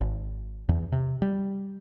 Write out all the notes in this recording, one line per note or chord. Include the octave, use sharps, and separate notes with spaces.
G#1
E2
C3
G3